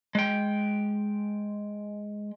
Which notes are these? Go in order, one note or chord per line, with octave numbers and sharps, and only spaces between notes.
G#3 G5